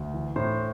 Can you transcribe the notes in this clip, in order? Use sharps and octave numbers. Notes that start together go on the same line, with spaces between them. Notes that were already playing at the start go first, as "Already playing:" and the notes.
Already playing: D2
E3
A2 C5